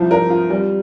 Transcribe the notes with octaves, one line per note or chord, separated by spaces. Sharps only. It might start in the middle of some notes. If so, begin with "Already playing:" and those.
Already playing: C2 F3
A#4
F4
G3